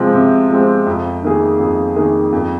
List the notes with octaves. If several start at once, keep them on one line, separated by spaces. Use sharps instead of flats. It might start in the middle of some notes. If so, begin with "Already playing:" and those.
Already playing: C3 F3 G#3 C4
C3
F3 G#3 C4
F2
D#3 A#3 G#4
F2
D#3 A#3 G#4
F2